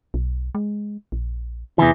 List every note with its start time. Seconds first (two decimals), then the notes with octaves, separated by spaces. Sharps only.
0.14 B1
0.55 G#3
1.12 A#1
1.78 E2 C3 E3